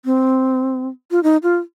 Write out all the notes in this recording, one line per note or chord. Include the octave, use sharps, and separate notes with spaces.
C4
F4
D#4
F4